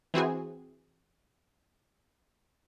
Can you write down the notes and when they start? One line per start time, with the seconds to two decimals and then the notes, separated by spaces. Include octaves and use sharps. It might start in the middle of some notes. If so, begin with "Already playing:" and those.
0.14 E3 C4 F#4 G#4